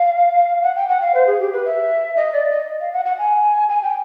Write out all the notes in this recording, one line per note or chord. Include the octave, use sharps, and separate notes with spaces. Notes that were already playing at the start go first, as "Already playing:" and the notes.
Already playing: F5
F#5
G5
F#5
F5
C5
G#4
G4
B4
E5
D#5
D5
D#5
F5
F#5
F#5
G#5
G#5
G5